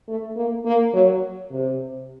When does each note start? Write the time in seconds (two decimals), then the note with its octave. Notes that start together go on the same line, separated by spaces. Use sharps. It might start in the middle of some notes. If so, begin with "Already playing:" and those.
0.08 A3
0.36 A#3
0.66 A#3
0.93 F#3
1.51 C3